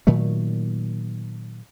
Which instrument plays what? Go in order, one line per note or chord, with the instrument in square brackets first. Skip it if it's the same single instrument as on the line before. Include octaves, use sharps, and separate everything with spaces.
[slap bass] A#2 D#3 F#3 A3